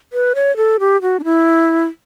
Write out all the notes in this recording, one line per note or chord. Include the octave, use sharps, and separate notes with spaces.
B4
C#5
A4
G4
F#4
D4
E4